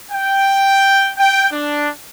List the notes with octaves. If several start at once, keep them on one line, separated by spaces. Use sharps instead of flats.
G5
G5
D4